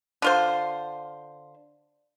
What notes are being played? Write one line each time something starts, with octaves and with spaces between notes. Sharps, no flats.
D3 F4 C5